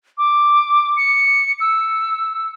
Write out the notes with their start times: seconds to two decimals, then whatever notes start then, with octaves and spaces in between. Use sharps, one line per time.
0.18 D6
0.97 C#7
1.60 E6